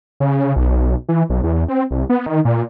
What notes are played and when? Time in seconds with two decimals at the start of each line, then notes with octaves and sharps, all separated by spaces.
0.20 C#3
0.56 B1
1.09 E3
1.30 B1
1.44 E2
1.68 C4
1.91 C2
2.10 B3
2.26 D#3
2.45 A#2